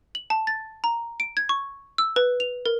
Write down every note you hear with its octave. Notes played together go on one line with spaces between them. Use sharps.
F#7
A5
A6
A#5
D7
G#6
C#6
E6
B4
F7
A#4